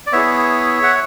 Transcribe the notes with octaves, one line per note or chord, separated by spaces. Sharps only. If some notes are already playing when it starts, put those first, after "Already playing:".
D5
B3 E4 G#4 C#5 E5
F#5